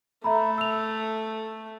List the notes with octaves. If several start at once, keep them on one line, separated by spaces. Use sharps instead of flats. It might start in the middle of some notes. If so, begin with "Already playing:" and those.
A3 E5 A#5 B5
E6 F7